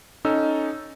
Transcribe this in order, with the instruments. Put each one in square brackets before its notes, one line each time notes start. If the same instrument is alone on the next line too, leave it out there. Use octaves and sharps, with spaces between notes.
[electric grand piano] C#4 D#4 A4 E6